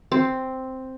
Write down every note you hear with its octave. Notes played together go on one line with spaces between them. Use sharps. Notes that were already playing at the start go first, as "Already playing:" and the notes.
C4